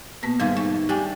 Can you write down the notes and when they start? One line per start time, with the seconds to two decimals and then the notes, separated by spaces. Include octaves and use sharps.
0.23 B2 A#3 B3
0.40 G#2 C3 D#3 G3 F5 G#6
0.57 A3 C#6
0.89 G3 D4 G4 G#4 G5 G#5